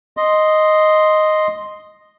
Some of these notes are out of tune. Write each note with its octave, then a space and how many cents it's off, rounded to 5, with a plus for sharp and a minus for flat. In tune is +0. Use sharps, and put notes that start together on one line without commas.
D#5 +0 C6 +0